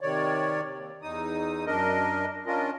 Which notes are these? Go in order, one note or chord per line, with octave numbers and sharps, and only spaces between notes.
C3 D#3 C#5 D5
D#2
E2 D#4 D#6
F#2 D4 A#4 D#5
C#4 D4 F4 A#4 D#5